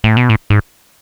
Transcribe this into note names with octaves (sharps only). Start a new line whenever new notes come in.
A2
B2
A2
G#2